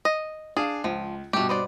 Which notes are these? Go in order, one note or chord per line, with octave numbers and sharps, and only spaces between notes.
D#5
D4 G#4 F5
C#2 F3
G2 B2 A3 G4
B3 C5 D5